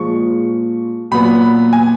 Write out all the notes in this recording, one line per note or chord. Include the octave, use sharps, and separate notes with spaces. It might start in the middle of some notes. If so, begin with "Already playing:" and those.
Already playing: A#2 F3 G#3 C#6
A#2 F#3 B3 B5
G#5